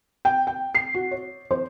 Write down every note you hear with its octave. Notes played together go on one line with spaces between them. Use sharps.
G5
G5
C7
F#4
C#5
C5